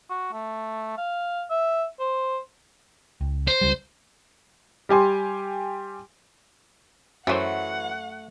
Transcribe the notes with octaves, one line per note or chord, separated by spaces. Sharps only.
F#4
A3
F5
E5
C5
C#2
C5
C#2 G3
G3 G4 G#5 C6
F#2 E3 F#3 A3 B4 C5 F#5